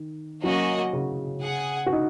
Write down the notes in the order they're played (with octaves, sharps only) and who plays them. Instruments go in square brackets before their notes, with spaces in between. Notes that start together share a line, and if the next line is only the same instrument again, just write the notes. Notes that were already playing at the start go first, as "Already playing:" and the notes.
Already playing: [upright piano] D#3
[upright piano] F#3 [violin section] A#3 C#4 F#4 D#5
[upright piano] C#3
[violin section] G#4 F#5
[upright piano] F#4
D#4